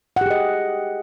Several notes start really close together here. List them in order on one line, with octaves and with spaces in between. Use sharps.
F#5 G4 G#4 D#5